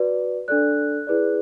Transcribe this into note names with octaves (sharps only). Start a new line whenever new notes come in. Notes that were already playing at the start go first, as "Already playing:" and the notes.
Already playing: F#4 B4 D5
D4 A4 D5 F#6
E4 G#4 B4 D5